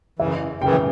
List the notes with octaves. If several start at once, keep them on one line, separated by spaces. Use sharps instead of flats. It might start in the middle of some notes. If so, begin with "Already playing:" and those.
F#2 C#3 E3 E5
F#2 C#3 E3 G5